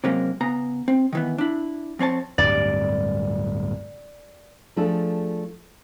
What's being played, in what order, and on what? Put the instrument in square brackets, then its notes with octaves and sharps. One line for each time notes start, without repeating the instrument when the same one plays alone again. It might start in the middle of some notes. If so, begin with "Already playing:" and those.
[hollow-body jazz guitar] C3 F#3 G#3 A#3 C4 C#4
C#3 B3 A#5
C4
D#3 E3 B3
D4 E4
F2 C4 C#5 A5
[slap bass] D1 G2 G3 [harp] D5
[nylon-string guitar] F3 A3 D4 G#4 A4